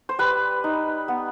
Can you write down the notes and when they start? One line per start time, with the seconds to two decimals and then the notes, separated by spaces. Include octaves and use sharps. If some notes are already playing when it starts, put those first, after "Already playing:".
0.09 C5
0.19 G3 B4
0.64 D#4
1.08 B3